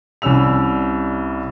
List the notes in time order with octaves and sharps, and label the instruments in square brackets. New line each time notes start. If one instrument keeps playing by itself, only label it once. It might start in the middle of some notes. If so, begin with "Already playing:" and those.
[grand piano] C2 G3 C#4 E6 F7